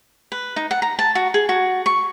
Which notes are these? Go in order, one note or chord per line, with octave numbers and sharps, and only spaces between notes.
B4
D#4
F#5
A#5
A5
F#4
G#4
F#4
C#6